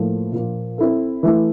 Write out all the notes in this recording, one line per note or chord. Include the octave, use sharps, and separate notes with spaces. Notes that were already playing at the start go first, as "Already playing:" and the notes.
Already playing: A2 F3 A#3 F4 A4
A#2 F3 A#3 F4
C4 E4 A4
E3 A3 E4